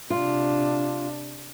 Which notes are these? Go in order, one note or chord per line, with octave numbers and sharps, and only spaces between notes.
C3 D4 F4